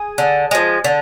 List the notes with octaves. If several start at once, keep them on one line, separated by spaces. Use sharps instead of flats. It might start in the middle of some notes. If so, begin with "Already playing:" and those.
Already playing: G#4
D3
F3 G#3
D3